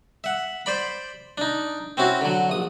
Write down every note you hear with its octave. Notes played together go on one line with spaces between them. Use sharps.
E5 F#5
C5 D5 B5
D4 D#4
C4 C#4 E4 F#4
D3 F#3
A#1 D#6